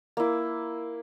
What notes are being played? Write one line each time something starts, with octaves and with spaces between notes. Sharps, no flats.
A#3 E4